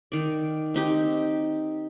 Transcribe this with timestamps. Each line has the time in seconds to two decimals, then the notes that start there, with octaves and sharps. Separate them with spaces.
0.12 D#3 D5
0.74 C4 D#4 G4